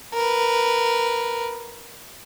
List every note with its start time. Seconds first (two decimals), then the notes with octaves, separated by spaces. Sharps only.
0.14 A#4 B4